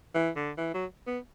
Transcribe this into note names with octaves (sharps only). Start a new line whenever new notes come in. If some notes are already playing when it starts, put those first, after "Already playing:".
E3
D3
E3
F#3
B3